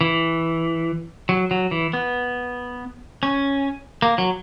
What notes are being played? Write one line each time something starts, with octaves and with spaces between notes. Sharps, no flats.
E3
F#3
F#3
E3
B3
C#4
A#3
F#3